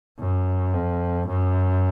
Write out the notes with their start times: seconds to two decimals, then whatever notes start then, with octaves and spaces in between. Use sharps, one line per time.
0.19 F#2
0.74 F2
1.27 F#2